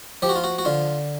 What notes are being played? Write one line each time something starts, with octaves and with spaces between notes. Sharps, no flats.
F3 G4
F#4
F4
F#4
F#4
D3 F4